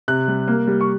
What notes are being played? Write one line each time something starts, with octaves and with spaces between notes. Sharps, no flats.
C3 F#6
G3
A#3
G3
C#6